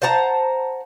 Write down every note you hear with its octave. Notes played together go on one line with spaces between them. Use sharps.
C5 F#5 A5 A#5